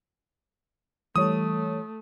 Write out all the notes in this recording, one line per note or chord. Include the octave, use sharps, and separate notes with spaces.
E3 G3 A3 C#5 D#6